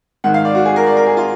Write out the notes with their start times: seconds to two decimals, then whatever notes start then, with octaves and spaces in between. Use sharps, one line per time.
0.24 G#2 D#3 F#5
0.34 F5
0.45 D5
0.55 F#4
0.65 G#4
0.76 A#4
0.86 D5
0.97 A#4
1.07 G#4
1.17 F4